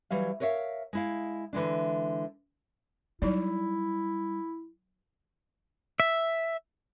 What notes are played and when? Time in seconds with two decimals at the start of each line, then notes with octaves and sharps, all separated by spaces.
0.11 E3 F#3 G3 F5
0.40 A#4 B4 C#5 D5 E5 F5
0.93 G#3 E4 F5
1.53 D3 E3 G#3 D4
3.22 F#3 G3 D#4 E4 D5
6.00 E5